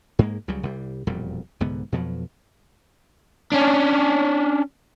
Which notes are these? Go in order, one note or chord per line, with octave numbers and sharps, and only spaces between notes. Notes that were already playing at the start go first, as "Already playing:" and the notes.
G#2 G#3 A#3
C#2 C#3 F#3 G3
C2 G3
E1 F2 A#2 G3
C2 G#2 D3 B3
F2 B2 F3 F#3
C#4 D4